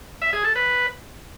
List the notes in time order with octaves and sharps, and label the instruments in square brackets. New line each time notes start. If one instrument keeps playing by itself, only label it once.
[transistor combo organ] E5
G#4
A4
B4